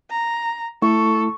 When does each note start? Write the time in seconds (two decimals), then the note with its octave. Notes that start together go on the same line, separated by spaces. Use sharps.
0.10 A#5
0.82 A3 E4 A4 C#6